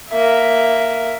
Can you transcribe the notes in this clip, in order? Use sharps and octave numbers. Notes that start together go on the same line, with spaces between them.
A#3 E5